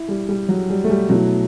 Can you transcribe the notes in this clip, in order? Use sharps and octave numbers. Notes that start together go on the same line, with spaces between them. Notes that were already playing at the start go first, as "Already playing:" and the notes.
Already playing: E4
G3
G3
F#3
G3
A3
G3
B2 F#3 A3 E4